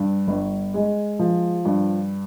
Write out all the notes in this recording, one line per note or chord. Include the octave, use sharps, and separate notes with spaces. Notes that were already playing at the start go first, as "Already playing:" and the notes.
Already playing: G2
G1
G#3
F3
G2